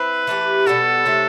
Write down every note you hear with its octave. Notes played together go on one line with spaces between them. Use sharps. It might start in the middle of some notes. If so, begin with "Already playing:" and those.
Already playing: C4 E4 B4
E3 A3 D#4 G4
B2 G3 B3 F#4 A4
C3 F#3 A3 D#4